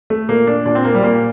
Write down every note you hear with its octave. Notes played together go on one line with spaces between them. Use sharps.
A3
A#2 A#3
D4
A#2 D4
C4
A#3
G3
A#2 A#3